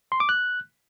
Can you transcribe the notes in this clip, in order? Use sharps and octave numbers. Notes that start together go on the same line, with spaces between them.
C6
D6
F#6